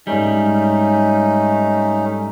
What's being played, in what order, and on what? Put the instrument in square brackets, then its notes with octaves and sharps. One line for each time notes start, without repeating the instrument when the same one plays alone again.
[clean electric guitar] G#2 G3 [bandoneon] A3 C#4 D#4